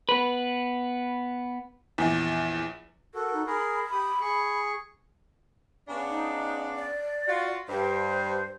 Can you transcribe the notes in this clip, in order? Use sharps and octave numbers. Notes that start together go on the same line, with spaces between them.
B3 B4
A#1 E2
F#4 A4 A#4
D#4
G#4 A#4 B5
G4 D#6
G#4 C#6
C#3 B3 D4
D#4
D5
F4 F#4
G2 C5